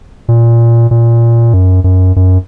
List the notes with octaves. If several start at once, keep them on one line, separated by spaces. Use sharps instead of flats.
A#2
A#2
F#2
F#2
F#2